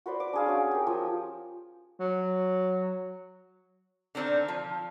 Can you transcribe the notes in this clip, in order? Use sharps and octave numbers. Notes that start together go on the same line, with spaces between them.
F#4 B4 C5 D5
D6
D4 G#4 F5
C#4 F#4
G4 A#4
F3
F#3
D3 D#3 C4 D4
F3